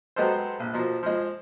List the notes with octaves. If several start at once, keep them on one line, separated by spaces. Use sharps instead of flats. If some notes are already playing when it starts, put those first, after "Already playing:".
F#3 G#3 B3 G4 A4 C5
A#1
B2 F3 A#3
F3 G#3